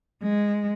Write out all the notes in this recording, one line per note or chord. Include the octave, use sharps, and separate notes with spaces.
G#3